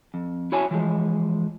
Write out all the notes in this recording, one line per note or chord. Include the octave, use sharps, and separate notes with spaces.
F2
E4 F#4 C#5 E5 G#5 A5
E3 F3 G#3